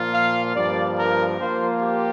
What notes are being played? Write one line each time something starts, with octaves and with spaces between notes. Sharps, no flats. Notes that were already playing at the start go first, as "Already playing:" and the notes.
Already playing: A#2 F3 A#3 F4
F5
G2 F3 A#3 D5
A#4
F3 A#3 F4 C5
G4